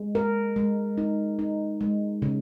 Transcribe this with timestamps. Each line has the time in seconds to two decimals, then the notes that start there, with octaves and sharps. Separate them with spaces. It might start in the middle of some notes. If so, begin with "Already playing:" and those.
Already playing: G#3
0.15 A#4
0.56 G#3
0.98 D#4
1.39 D#4
1.81 G#3
2.22 C#3